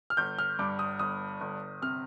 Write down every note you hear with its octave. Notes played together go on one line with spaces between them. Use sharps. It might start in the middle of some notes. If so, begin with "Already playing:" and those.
F6
G1 G6
F6
G2 D6
D#6
G1 D#6
G1
C3 F6